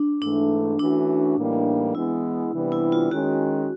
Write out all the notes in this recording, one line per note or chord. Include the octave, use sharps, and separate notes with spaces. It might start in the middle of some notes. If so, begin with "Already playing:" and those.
Already playing: D4
G#2 E3 A3 D4
E3 A3 C#4 D4 F#4
A2 E3 G3 A#3 D#4
E3 G#3 B3 E4
C3 E3 G3 B3 D4
E4
F4
D#3 G#3 C#4 F#4